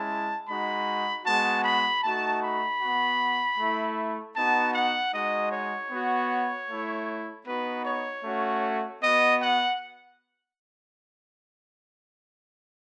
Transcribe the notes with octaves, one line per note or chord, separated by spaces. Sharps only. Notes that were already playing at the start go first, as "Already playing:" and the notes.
Already playing: G#3 C#4 E4 A5
G#3 D#4 F#4 B5
G#3 B3 F#4 A5
B5
A3 D#4 F#4 A5
B5
B3 F#4
A3 E4
B3 D#4 F#4 A5
F#5
G#3 D#4 F#4 D#5
C#5
B3 F#4
A3 E4
B3 D#4 F#4 B4
C#5
A3 C#4 F#4
B3 F#4 D#5
F#5